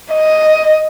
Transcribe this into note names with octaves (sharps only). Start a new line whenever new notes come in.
D#5